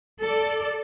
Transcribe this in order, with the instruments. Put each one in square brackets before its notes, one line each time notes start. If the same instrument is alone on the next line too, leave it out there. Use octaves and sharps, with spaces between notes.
[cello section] A4 D5